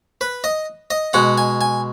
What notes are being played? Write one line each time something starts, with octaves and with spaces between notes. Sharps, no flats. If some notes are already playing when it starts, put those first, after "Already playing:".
B4
D#5
D#5
B2 G#3 F#5
G#5
G#5